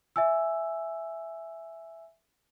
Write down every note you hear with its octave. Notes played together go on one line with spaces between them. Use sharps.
E5 G#5 E6